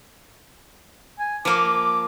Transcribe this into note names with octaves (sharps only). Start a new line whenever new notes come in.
G#5
F3 A#3 D6